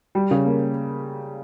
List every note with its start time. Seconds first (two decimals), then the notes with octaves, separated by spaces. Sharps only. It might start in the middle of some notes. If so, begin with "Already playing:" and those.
0.15 G3
0.31 C#3
0.46 A#3